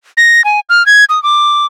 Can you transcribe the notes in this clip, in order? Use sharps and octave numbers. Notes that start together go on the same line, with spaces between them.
A#6
G#5
F6
G#6
D#6
D6